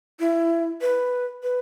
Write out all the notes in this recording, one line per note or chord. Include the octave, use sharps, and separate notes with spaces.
E4
B4
B4